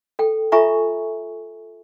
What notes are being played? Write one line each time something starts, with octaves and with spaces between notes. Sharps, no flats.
A4 G5
F4 A4 E5 G#5 A#5 C#6